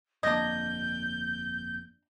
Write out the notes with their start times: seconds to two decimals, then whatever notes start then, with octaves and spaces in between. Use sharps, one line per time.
0.23 G1 F2 A#3 D4 D#5 G6 G#6 A#6